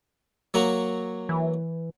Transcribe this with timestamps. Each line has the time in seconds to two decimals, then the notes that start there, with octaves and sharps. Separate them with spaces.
0.54 F#3 A#3 F#4
1.29 E3